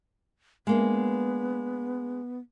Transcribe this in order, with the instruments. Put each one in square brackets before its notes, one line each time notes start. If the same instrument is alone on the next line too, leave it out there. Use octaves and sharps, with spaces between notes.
[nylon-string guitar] G#3 A#3 D4 [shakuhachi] B3